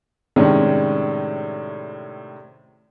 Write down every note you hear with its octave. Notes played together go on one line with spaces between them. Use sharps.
A2 C3 D#3 G#3 C#4 D4